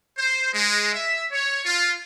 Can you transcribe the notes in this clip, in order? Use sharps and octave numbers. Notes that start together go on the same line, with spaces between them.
C5
G#3
E5
C#5
F4